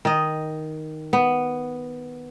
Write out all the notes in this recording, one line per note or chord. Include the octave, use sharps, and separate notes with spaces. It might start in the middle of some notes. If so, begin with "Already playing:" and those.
D#3 D#5
B3